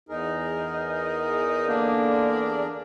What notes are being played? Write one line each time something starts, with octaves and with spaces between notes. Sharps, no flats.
E2 D#4 G#4 A#4
D3 A#3 D4